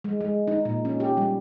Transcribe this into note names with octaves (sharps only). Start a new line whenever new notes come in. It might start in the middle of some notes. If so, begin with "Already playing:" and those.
G#3
G#3
D#4
A#2
C#4
G4
G3